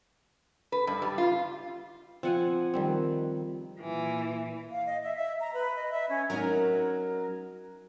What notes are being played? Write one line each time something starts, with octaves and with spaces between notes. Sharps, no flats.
B4
G2
G3
F4
F3 C4 F#5 G#5
D#3 G3 C4
A#2 E3
F5
D#5
E5
E5
A#5
B4
D#5
E5
C#4
F#3 C#4 D#4 A#4